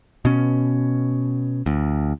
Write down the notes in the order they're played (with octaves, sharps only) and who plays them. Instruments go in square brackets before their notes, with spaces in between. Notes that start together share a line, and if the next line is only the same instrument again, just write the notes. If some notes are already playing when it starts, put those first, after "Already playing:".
[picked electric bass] B2 C#4
D2